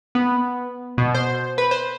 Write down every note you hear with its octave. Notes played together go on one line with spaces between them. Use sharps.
B3
B2
C5
B4
C5